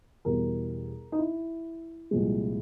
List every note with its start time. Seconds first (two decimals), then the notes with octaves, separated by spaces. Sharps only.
0.25 E2 B2 G3 A#4
1.12 D#4
1.19 E4
2.11 C2 A#2 F3 G#3